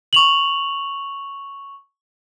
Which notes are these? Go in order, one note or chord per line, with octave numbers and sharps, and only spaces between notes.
C#6 F7 F#7